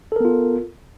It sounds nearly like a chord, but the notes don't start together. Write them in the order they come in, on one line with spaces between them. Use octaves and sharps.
A4 A#4 B3 F4